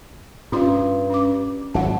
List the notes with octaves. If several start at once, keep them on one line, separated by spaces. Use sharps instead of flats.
G2 C#4 F4 C6
C#4 D6
G#1 F#3 C#5 F#5 A5